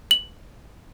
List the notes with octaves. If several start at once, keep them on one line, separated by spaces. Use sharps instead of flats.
F#7